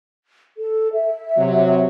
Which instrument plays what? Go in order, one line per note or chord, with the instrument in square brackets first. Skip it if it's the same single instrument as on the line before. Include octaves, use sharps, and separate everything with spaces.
[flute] A4
E5
[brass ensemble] C3 F#3